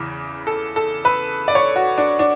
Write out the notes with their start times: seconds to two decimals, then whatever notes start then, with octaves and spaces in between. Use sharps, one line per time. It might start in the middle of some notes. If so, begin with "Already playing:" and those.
Already playing: E2 C#3 E3
0.47 A4
0.76 A4
1.05 B4
1.48 D5
1.55 C#5
1.76 F#4
1.98 D4
2.19 D4